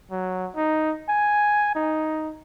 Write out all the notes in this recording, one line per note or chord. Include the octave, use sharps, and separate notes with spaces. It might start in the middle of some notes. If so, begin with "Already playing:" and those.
F#3
D#4
G#5
D#4